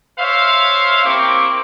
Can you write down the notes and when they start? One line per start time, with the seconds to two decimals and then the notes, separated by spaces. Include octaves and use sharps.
0.18 C5 C#5 E5 F5
1.04 A#3 C4 E4 G4 C#6 D6